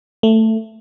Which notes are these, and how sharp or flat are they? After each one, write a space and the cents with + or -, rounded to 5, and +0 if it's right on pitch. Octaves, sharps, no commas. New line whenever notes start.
A3 +10